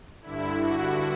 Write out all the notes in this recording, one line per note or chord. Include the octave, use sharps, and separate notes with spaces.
G2 D3 E4
F#4